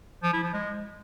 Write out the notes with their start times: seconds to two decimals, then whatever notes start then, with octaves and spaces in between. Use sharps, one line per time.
0.23 F3
0.33 E4
0.43 F3
0.53 G#3